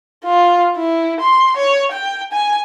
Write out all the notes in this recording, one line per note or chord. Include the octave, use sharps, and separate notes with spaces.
F4
E4
C6
C#5
G5
G#5